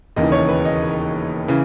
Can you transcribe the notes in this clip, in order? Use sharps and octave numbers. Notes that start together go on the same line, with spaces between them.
E1 D#2 C#3 E3 D#5
C#5
B4
D#5
C#3 E3